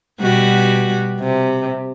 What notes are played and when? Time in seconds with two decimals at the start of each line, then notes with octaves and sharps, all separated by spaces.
0.20 B2 G3 F#4
1.20 C3